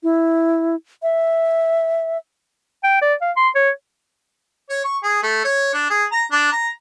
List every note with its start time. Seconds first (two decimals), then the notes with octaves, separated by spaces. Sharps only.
0.03 E4
1.03 E5
2.83 G5
3.02 D5
3.21 F5
3.37 C6
3.55 C#5
4.70 C#5
4.85 C#6
5.03 G#4
5.23 A3
5.44 C#5
5.74 D4
5.90 G#4
6.12 A#5
6.32 D4
6.52 A#5